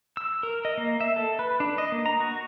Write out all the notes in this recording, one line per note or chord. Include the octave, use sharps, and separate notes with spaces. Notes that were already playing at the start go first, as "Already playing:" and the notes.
E6
A#4
D#5
A#3
E5
A4
B4
D4
D#5
A#3
A#5
F#4